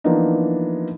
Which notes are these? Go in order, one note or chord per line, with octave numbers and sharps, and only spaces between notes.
E3 F3 A#3 B3 D4 D#4